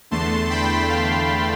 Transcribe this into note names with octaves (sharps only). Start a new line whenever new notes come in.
E2 D3 A3 A5 C6
G5 B5
F5 A5